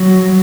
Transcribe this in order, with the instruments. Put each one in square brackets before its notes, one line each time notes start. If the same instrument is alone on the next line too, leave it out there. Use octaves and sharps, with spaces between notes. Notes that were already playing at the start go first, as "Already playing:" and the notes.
Already playing: [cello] F#3